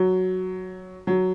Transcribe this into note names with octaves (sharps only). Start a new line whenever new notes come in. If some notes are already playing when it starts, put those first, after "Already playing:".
Already playing: F#3
F#3